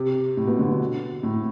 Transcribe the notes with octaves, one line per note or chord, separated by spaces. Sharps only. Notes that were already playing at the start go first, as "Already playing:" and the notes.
Already playing: C3
A2
B2
D3
A2